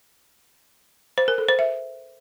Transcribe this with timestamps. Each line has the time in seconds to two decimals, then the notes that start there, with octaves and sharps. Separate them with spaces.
1.18 C5
1.28 A#4
1.38 A4
1.48 C5
1.59 E5